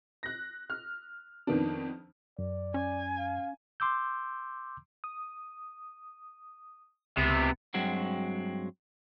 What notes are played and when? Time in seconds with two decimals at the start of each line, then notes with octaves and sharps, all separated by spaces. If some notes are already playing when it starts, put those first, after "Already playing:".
0.23 F#6 A#6
0.70 F6
1.47 F2 D#3 B3 D4
2.39 F#2 D5
2.74 C#4 G#5
3.18 F5
3.80 C6 D6 E6 G6
5.04 D#6
7.18 C#2 C3 B3
7.74 G2 F#3 G#3 C4 F#4